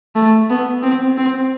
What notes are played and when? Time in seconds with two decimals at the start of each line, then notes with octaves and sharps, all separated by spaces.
0.15 A3
0.50 B3
0.83 C4
1.17 C4